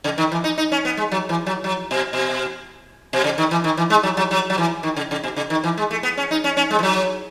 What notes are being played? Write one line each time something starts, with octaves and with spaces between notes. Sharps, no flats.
C#3
D#3
E3
D#4
D#4
C#4
B3
G#3
F#3
E3
F#3
F#3
B2
B2
B2
C#3
D#3
E3
D#3
E3
G#3
F#3
F#3
F#3
F#3
E3
D#3
C#3
C#3
B2
C#3
D#3
E3
G#3
A3
B3
C#4
D#4
C#4
C#4
G#3
E3
F#3